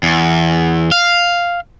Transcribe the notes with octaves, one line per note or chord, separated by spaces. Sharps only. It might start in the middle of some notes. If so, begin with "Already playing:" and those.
E2
F5